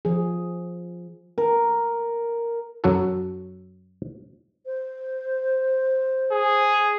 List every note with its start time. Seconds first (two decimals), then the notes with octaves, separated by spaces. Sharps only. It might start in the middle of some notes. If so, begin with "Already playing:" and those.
0.05 F3 G#4
1.38 A#4
2.84 F#2 F#3 F#4 A4
4.66 C5
6.32 G#4